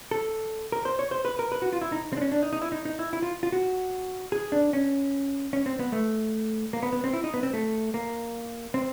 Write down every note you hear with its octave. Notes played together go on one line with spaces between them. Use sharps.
A4
A#4
C5
C#5
C5
B4
A#4
B4
F#4
F4
E4
D#4
C4
D4
C#4
D4
D#4
D#4
E4
D#4
D#4
E4
E4
F4
F4
F#4
G#4
D4
C#4
C#4
C4
B3
A3
A#3
B3
B3
C4
E4
D#4
B3
C4
A3
A#3
C4